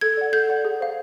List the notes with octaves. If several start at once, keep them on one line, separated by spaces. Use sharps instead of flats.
A4 G#6
D5 F#5
A4 G6
D5 F#5
G#4
C5 F5